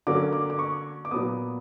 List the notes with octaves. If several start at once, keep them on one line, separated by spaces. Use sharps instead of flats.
D3 F#3 A#3 C#4 D6
D6
D6
C#6
D6
A#2 F#3 B3 D#6